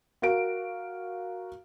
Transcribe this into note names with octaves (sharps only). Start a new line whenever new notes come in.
F#4 A#4 F5 D7